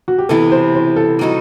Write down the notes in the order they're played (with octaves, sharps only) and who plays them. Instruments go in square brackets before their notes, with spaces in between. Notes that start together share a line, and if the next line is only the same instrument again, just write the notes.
[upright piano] F#4
G4
[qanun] C3 E3 B3 [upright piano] A4
[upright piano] C5
C5
A4
[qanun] G3 D#4 F#4 A4